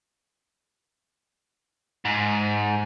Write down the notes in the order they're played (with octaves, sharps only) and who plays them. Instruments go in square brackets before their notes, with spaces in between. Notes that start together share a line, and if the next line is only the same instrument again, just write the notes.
[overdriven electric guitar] G#2